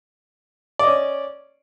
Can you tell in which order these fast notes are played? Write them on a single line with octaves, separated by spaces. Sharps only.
D5 D#5 C#4